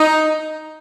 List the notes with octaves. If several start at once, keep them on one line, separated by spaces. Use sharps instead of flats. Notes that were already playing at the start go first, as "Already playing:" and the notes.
Already playing: D#4